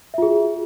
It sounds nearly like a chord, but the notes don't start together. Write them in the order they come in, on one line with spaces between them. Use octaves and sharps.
E5 F4 G#4 F#4